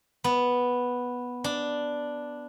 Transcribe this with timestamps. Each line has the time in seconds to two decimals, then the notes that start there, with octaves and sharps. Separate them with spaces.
0.24 B3
1.44 D4